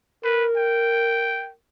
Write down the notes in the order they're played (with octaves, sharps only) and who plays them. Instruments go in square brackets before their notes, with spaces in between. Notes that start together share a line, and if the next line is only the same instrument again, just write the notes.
[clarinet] A#4 [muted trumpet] B4
[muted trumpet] G5